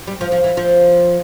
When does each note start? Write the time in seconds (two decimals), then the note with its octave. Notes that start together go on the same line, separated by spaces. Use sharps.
0.07 G3
0.21 F3
0.32 F3
0.44 E3
0.57 F3